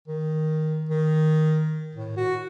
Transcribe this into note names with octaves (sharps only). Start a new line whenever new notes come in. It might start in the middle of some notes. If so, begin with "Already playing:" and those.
D#3
D#3
A2
F#4